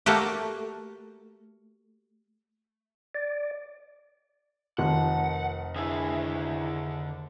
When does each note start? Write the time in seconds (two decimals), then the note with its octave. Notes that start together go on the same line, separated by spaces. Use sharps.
0.06 A3 A#3 F#4 G4
3.15 D5
4.78 F1 D#3 F3 F#5
5.76 D3 E4 G#4 E5